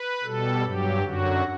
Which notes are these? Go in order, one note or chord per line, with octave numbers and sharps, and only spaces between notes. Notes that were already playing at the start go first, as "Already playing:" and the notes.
Already playing: B4
B2 G3 A4
G2 F#3 G4
F#2 D3 F#3 F#4